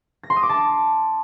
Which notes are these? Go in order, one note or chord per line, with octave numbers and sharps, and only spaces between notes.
A#6
C6
D#6
D6
A5